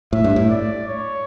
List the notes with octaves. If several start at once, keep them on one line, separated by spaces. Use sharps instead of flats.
A2 E5
G2
A2
D5
C#5